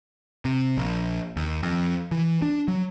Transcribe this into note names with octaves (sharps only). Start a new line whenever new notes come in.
C3
A#1
D#2
F2
E3
D4
F#3